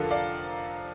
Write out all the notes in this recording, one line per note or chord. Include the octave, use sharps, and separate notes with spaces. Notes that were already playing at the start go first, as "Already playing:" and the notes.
Already playing: F1 F2 D3 F4 A4 A#4
D5 F5